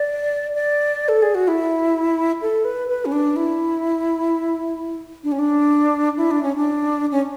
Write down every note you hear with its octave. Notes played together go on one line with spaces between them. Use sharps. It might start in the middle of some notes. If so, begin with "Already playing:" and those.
Already playing: D5
D5
A4
G#4
F#4
E4
A4
B4
B4
C#4
D4
E4
D4
C#4
D4
E4
D4
C#4
D4
C#4